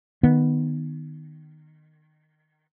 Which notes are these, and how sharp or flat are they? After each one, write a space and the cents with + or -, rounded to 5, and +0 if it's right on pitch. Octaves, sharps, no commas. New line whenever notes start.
D#3 -15 B3 +0